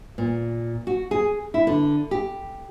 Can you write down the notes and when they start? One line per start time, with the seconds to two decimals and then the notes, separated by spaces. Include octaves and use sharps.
0.18 A#2
0.87 F#4
1.11 G#4
1.54 E4
1.67 D3
2.11 G4